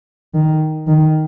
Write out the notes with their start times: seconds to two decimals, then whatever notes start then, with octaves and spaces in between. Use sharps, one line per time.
0.34 D#3
0.87 D#3